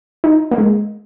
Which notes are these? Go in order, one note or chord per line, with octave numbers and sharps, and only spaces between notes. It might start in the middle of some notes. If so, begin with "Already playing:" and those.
D#4
A#3
G#3